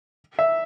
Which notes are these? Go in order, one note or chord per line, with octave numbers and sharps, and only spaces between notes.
E5